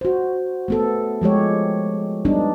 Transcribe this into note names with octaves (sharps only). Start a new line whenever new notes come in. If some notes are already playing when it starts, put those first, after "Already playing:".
F#4 C5
A3 B3 A4
F3 G#3 G4 C#5
G3 B3 D4 D#4